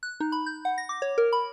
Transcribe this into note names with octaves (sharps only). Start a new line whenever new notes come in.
F#6
D#4
B5
G6
F#5
A#6
D6
C#5
A#4
B5